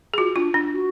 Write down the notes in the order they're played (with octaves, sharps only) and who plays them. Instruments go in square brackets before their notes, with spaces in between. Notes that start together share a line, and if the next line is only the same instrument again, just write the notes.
[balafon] G#4
[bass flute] F4 [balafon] F#4
[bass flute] D4 [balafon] F4
[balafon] D4
[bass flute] F#4